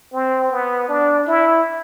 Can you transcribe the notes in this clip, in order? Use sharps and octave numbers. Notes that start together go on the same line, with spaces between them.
C4
B3
D4
E4